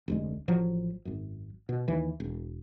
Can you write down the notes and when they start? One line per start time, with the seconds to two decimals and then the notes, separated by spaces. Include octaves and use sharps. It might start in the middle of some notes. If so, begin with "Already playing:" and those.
0.08 F1 D2 G#3
0.48 A1 F3 F#3
1.05 G#1 F#2
1.69 B2
1.88 D#2 E3
2.20 E1